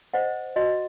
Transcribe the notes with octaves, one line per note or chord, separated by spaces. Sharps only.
C5 D#5 F#5
F#4 D#5